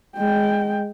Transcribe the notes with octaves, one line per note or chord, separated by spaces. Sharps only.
G#3 G5